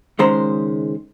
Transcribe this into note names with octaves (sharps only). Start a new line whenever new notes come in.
C#2 D#3 G#3 C#4 C5 A#5